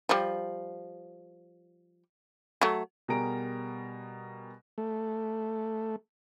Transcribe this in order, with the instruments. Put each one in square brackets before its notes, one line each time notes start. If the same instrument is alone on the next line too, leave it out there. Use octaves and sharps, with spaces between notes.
[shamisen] F3 G3
F#3 A3
[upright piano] B2 G3 G#4 A#4 A#5 D7
[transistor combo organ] A3